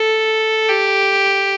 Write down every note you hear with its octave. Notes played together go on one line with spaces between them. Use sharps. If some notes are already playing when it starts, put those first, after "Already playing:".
Already playing: A4
G4